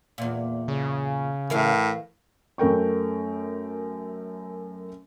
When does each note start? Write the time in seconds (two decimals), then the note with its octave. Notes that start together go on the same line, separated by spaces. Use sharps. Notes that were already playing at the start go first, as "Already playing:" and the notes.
0.18 E2 A#2
0.68 C#3
1.50 A2 E3 A#4 F5
2.58 F#2 A3 A#4 G5 C#6